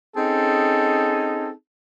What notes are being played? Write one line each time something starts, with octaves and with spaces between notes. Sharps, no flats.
C4 C#4 D#4 G#4 A4